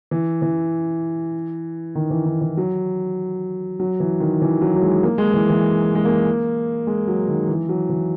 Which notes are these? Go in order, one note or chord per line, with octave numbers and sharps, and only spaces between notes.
E3
E3
D#3
E3
D#3
E3
F#3
F#3
E3
D#3
E3
F#3
F#3
G#3
A#3
G#3
E3
E3
G#3
A#3
G#3
F#3
D#3
E3
F#3
E3